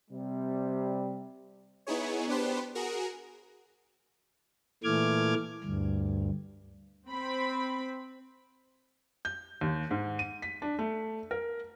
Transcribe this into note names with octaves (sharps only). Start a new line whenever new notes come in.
C3 G3
B3 D#4 E4 G#4 C#5
B3 D4 G4 B4 C5
F#4 G#4 A#4
A#2 E3 A3 D6 F6 G#6
D2 G2
C4 B5
G6
D#2
G#2
D#7
B6
D4
A3
A#4